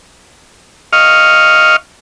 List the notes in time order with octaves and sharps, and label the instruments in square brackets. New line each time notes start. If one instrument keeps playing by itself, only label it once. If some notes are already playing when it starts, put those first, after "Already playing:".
[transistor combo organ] D#5 F5 C#6 F6